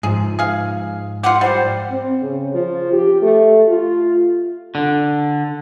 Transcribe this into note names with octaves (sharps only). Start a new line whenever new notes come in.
G#2 F3 G#4
G#4 F5
F4 G4 F#5
G3 C5
C4
C#3
F3
G4
A3
F4
D3